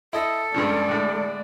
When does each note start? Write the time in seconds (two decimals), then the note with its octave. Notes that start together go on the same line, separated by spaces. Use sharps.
0.13 E4 A4 D#5
0.54 G2 C#3 F3 G#3 D5
0.89 A2 D3